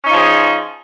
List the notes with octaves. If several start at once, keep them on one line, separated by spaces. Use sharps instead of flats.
F3 C#4 D#4 F4 G#4